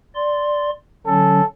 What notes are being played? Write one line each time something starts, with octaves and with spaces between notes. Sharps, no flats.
D5 C6
D3 F#3 C#4 A4